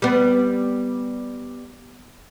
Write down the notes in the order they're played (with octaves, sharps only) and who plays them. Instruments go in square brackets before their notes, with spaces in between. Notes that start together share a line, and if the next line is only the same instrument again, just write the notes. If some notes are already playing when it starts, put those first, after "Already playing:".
[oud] G3 B3